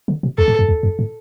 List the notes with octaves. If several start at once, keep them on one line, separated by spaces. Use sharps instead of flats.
D3
B2
E2 A4
A2
F#2
E2
F#2
A2